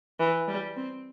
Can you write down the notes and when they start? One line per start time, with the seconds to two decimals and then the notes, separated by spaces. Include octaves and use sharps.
0.19 E3
0.48 G3
0.76 C4